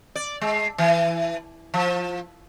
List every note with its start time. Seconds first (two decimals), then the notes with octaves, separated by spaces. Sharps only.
0.15 D5
0.41 G#3
0.78 E3
1.74 F3